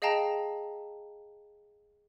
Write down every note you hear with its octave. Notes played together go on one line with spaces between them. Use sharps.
G#4 D#5 F5 G5 A5 A#5